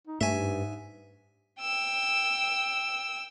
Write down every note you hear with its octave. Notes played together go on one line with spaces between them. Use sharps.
D#4
G2 A3 E5 G#5
G#2
G5 E6